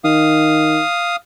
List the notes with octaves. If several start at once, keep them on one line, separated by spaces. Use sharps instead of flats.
D#3 F5 D#6